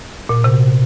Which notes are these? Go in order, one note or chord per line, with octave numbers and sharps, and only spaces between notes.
A#2
C3